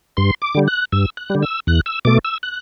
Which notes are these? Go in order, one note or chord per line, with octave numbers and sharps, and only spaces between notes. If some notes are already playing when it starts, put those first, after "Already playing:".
G2 C6
D6
D3 G3
F#6
G2 E6
F#6
D3 G3
E6
E2 F#6
E6
B2 A3 D6
E6
F#6